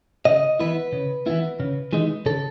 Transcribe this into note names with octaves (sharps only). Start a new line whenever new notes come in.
C#3 D#5
E3 B3 E4 B4
C#3
E3 B3 E4
C#3
E3 G#3 D#4
C#3 A4